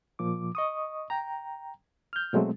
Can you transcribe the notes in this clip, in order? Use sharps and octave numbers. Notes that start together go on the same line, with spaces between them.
A#2 F3 D6
D#5 C#6 D#6
G5 A#5
F6 G6
B2 F#3 G#3 A3 C4